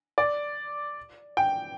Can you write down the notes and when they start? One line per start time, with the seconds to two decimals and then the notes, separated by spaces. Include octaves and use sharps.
0.18 D5
1.37 G5